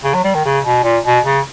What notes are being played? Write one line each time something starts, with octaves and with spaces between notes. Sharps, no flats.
C#3
F#3
G3
D#3
C#3
B2
A#2
B2
C#3